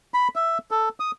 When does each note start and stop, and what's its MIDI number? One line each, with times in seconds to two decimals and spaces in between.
0.14 0.28 83
0.36 0.58 76
0.71 0.89 69
1.00 1.11 87